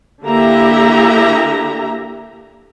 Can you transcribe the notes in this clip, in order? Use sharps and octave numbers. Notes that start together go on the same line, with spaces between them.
D3 A#3 E4 G4 E5 A#5